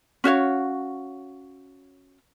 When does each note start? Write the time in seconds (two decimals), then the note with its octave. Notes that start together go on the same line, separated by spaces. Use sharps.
0.24 C#4 F#4 C#5 F5